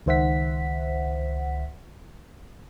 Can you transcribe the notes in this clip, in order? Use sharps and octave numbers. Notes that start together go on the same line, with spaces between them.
C#2 D#3 C5 E5 F#5 B6